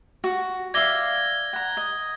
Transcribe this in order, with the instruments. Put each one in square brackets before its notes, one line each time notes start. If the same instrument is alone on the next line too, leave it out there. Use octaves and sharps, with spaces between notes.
[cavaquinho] F#4
[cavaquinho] D5 E5 F5 [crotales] G#6 A#6 G7
[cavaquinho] F#5 A#5
D#5